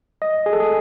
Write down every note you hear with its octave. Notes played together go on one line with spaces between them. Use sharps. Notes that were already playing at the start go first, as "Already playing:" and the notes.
D#5
G#4
A4
G#4